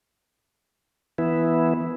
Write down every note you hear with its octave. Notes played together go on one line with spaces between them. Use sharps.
E3 B3 E4